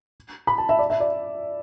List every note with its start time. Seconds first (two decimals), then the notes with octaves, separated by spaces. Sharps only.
0.47 B5
0.58 A5
0.69 E5
0.79 D5
0.90 E5
1.00 D5